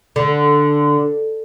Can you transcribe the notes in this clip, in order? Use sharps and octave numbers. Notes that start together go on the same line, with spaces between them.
D3